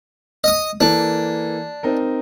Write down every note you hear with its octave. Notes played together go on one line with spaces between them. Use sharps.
D#5 D#6
E3 A#3 D4 A4
C4 D#4 A#4